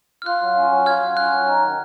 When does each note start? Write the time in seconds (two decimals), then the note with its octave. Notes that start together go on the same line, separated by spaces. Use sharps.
0.22 F6
0.26 F4 F#6
0.42 F#3
0.57 C#4
0.72 F#3
0.86 F4 F6 G#6
1.02 F#3
1.17 C#4 F#6
1.33 F#3
1.47 D#4
1.63 D#3